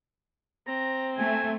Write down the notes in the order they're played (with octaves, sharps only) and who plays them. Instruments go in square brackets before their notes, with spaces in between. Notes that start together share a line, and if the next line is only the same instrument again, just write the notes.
[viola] C4 [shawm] A#5
[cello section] A3 [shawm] G#5